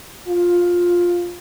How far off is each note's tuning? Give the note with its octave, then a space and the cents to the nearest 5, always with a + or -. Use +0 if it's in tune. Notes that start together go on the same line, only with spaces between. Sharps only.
F4 +10